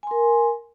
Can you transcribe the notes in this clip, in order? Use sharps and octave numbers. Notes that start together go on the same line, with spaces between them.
A#4 G#5 C6